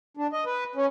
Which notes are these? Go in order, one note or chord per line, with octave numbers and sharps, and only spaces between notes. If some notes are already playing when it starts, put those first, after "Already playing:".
D4
D#5
B4
C#4